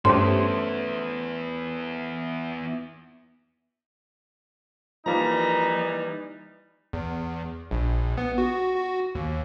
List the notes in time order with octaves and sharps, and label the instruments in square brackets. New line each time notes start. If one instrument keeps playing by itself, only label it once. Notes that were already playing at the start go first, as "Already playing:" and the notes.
[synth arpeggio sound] G2 G4 [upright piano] A3 C#4 C5 [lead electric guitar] B3 E4 [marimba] C6
[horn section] E3 G3 D#4 [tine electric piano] F3 A#3 [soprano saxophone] A#5
[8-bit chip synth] E2
A#1
B3
F#4
F#4
D#2